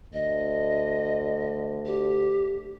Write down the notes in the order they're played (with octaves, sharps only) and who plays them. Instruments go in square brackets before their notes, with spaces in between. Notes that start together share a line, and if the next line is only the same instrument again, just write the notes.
[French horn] D2 [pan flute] D#5
[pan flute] G4